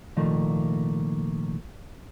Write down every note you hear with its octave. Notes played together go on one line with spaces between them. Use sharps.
C2 A#2 D#3 F3 A3 A#3